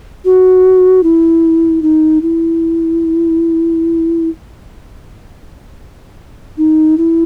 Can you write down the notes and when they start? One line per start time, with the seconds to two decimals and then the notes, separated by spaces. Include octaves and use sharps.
0.25 F#4
1.03 E4
1.82 D#4
2.22 E4
6.58 D#4
6.97 E4